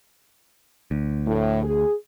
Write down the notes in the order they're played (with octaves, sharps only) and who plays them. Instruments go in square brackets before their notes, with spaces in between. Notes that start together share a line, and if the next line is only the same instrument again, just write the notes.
[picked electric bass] D2
[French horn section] A2
G#4